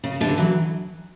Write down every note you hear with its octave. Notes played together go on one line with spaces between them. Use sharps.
C#3
D3 E3
E3 F#3